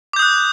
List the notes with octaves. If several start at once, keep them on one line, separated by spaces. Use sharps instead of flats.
D6 D#6 F#6 G6